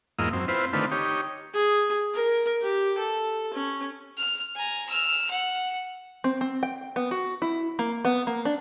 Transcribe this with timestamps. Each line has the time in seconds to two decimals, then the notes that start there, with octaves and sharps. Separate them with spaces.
0.19 E2 G#2 A#3 F4 D#5 E6
0.33 F#2 C4
0.48 C4 E4 F4 B4 C5
0.73 D3 D#3 A3 C4 F4 B4
0.91 D#4 G4 C#5
1.54 G#4
2.14 A#4
2.62 G4
2.98 A4
3.53 C#4
4.17 F6
4.55 G#5 A#5
4.89 E6 F6
5.31 F#5
6.24 C4
6.41 C4
6.63 G5
6.96 B3
7.11 F#4
7.42 E4
7.79 A#3
8.05 B3
8.27 A#3
8.45 D4